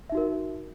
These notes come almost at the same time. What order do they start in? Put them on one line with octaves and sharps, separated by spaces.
E5 D#4 F#4 A#4